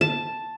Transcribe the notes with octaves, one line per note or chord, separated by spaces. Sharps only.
A5